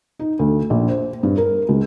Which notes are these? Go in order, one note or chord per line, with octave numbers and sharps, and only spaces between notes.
D#4
D2
A#1
C5
G2
A#4
C#2